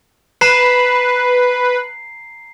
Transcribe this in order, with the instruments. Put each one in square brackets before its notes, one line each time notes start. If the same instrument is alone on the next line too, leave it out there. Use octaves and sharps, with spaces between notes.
[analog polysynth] B4 [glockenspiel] A#5 C7